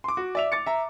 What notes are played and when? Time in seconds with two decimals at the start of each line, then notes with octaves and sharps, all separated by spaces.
0.04 C6 D6
0.17 F#4
0.35 D5 E5 F7
0.52 D6 A6 C#7
0.66 E5 A#5